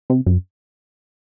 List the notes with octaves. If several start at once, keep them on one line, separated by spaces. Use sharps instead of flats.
C3
F#2